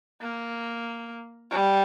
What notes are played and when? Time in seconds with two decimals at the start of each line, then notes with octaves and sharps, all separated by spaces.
0.21 A#3
1.51 G3